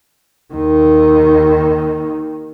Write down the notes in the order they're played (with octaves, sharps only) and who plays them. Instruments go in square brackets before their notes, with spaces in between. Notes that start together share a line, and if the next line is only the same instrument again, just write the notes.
[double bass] D#2 D#3